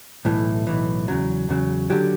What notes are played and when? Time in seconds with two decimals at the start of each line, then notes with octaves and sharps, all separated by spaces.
0.25 B1 A2 E3
0.67 B1 A2 E3
1.08 E2 C#3 F#3
1.49 E2 C#3 F#3
1.90 D3 F#3 G4